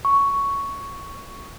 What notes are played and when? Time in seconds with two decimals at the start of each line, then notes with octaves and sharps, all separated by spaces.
0.05 C#6